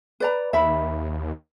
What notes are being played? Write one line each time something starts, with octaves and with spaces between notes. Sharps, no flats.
B4 D5 A#5
D#2 E5 B5